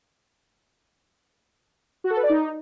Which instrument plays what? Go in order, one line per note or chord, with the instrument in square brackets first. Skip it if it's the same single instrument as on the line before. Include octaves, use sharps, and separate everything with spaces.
[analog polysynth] F#4
A4
B4
D5
D#4